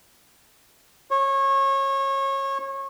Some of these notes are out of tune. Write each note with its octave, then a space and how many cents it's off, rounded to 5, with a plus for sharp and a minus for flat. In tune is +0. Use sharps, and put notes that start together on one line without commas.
C#5 -25